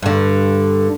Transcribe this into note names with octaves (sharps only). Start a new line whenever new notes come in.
G2 D3